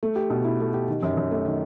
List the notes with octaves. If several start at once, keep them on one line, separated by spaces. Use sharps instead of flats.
A3
G4
B2
E4
A3
G4
D#3
F#2
F#2
A3
D#3